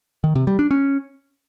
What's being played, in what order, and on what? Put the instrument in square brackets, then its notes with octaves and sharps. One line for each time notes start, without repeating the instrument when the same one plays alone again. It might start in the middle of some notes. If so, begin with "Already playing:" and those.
[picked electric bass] D#3
C3
G3
D4
C#4